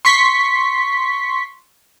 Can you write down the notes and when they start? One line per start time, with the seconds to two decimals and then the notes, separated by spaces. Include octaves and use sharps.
0.05 C6 C#6 B6